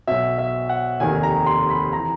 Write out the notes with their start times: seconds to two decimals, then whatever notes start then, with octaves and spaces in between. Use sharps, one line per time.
0.07 B1 B2 E5
0.38 E5
0.69 F#5
1.00 F1 D#2 D#3 G#5
1.23 A#5
1.47 C6
1.70 B5
1.93 E3 A#5